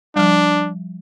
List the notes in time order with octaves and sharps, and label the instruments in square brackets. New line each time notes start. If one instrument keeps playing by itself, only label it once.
[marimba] F3 G3 [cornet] D4